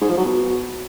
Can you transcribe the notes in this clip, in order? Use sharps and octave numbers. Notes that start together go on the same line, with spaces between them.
G#2
F3
F#3
B2